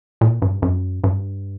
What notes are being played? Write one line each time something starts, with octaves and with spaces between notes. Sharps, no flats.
A#2
G2
F#2
G2